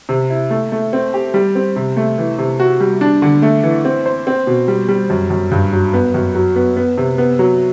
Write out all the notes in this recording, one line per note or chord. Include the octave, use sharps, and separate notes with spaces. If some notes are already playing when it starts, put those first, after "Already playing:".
C3
E4
A3
A3
C4
G4
G3
C4
C3
A3
E3
C3
F#4
G3
D4
D3
A3
E3
C4
C5
C4
B2
G3
G3
F#2
F#2
G2
F#3
B3
F#2
F#3
B3
B3
C3
B3
F#3